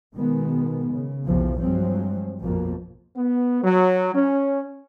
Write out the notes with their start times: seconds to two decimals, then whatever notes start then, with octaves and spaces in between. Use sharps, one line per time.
0.14 B2 D#3 G#3 B3
0.92 C#3
1.25 B1 E2 C3 E3 F3
1.60 G2 F3 F#3 G#3 C4
2.40 A#1 F2 B2 F3 A#3
3.16 B3
3.63 F#3
4.14 C#4